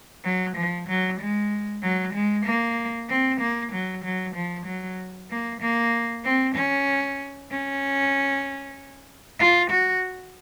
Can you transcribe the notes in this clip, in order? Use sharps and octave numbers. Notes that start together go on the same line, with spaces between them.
F#3
F3
F#3
G#3
F#3
G#3
A#3
C4
A#3
F#3
F#3
F3
F#3
A#3
A#3
C4
C#4
C#4
F4
F#4